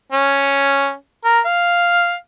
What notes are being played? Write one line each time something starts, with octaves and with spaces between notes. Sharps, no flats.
C#4
A#4
F5